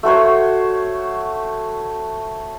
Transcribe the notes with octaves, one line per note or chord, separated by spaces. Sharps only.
A3 F#4 C5 C#5